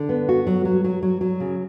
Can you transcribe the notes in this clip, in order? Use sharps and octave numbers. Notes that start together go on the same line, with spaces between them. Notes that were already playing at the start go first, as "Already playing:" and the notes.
Already playing: D3
B3
F#4
F#3
F#3
F#3
F#3
F#3
C#3